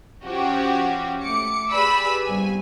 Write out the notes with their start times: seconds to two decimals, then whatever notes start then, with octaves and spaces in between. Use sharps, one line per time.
0.25 F3 C#4 F#4 G4
1.22 A3 D6 C#7
1.72 G4 G#4 B4 D5 B5 E6
2.25 G1 C2 G#5